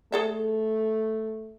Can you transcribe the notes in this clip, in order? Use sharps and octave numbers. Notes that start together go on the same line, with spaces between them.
A3 G#4 A4 E5